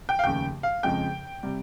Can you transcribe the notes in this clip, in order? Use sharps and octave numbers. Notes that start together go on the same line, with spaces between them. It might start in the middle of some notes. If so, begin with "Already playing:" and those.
G5
F5
F1 D#2 C#3 G5
F5
F2 C#3 F3 G#3 G5
C3 G3